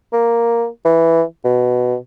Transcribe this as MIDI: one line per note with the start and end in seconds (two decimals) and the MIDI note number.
0.13 0.67 58
0.85 1.22 52
1.44 1.96 47